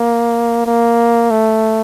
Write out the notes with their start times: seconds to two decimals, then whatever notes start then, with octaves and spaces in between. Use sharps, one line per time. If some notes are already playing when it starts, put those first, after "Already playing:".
Already playing: A#3
0.66 A#3
1.31 A3